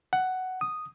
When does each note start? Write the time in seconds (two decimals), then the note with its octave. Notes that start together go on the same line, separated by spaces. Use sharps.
0.13 F#5
0.61 D#6